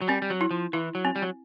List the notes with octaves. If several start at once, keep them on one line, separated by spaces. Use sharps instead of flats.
F#3
G3 C4
G3
F#3
E4
F3
E3 E4
F#3
C4
G3
F#3